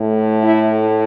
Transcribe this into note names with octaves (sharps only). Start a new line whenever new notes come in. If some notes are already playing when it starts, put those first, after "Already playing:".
Already playing: A2 A3
E4